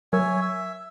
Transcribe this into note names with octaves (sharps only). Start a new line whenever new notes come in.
F#3 A#4 C#5 E5 G#5
E5